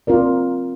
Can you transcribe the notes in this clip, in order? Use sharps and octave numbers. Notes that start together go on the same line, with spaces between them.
C4 F4 A#4 D5